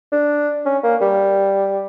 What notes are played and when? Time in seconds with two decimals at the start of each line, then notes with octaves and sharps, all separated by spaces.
0.12 D4
0.66 C#4
0.83 A#3
1.01 G3